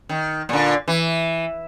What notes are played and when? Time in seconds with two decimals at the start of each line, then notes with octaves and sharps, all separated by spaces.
0.09 D#3
0.49 A#2 D3
0.88 E3